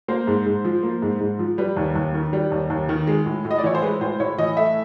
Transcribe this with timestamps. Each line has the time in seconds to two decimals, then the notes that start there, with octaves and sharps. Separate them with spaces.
0.08 A#3 C5
0.27 G#2
0.46 G#2
0.65 F3
0.83 A#3
1.02 G#2
1.21 G#2
1.39 F3
1.58 G3 B4
1.77 D#2
1.95 D#2
2.15 D#3
2.33 G3
2.52 D#2
2.70 D#2
2.89 D#3
3.07 G#3
3.26 A2
3.45 A2
3.51 D#5
3.58 D5
3.64 E3 C#5
3.75 C5
3.82 G#3 B4
4.01 A2 C5
4.20 A2 C#5
4.38 E3 D#5
4.57 A3 E5